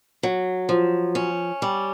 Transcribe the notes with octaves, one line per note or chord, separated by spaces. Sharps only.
F#3
F3
C#4
G3